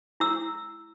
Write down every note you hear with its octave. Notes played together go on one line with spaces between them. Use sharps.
E4 E6